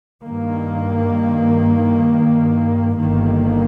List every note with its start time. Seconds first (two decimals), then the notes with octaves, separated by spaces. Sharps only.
0.23 G2 D#3 A#3
2.98 G1 G2 D#3 A#3